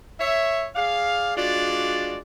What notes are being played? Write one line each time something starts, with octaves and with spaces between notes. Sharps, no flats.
C#5 E5
G#4 D5 F5
G#3 D4 F4 F#4 D5